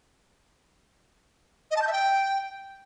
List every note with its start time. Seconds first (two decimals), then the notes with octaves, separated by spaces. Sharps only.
1.71 D#5
1.76 A5
1.82 G6
1.87 E5
1.93 G5